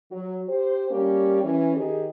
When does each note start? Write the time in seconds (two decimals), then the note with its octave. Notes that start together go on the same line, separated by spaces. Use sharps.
0.12 F#3
0.49 G4 C5
0.91 G3 A#3 C#4 G4
1.43 E3 C#4
1.76 D#3 G4 G#4